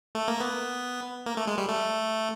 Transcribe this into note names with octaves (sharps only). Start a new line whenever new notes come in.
A3
A#3
B3
A#3
A3
G#3
G3
A3